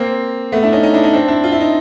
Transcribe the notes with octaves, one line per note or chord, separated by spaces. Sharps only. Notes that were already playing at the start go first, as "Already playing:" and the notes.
Already playing: A#3 C4
A3 B3
D4 E4
C#4 D#4
C#4 D#4
D4 E4
C#4 D#4
C4 D4
D4 E4
F4
E4
D#4